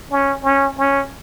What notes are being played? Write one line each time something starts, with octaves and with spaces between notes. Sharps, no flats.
C#4
C#4
C#4